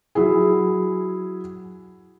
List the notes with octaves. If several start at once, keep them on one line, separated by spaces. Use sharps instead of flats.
F#3 E4 G#4